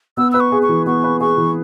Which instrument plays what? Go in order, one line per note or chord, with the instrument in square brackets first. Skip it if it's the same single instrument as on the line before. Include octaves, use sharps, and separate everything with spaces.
[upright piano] B3 [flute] E6
[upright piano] B4 [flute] E6
[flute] C#6
[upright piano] G#4
[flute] C#6
[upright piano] E3
[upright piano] B3 [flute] C#6
[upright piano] B4
[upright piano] G#4 [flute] C#6
[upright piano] E3